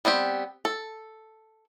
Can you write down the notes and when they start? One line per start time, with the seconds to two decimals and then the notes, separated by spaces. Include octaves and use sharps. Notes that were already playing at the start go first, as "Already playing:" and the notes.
0.05 G3 B3 C4 G4
0.65 A4